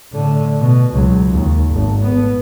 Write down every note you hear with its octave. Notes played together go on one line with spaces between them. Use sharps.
A2 D3
B2
C#2 F#3
D#2
G#1
A2 B3